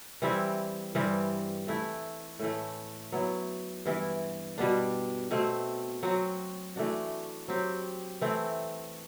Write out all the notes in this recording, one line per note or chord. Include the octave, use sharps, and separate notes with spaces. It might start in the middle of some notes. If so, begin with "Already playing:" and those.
E3 G3 C4 E4
G2 E3 G3 C4
E3 A3 E4
A2 E3 A3
F#3 B3 E4
G2 E3 B3 E4
B2 G3 B3 D4
B2 A3 C4
F#3 C4 F#4
E3 A3 D4 F#4
F#3 C4 G4
E3 A3 C4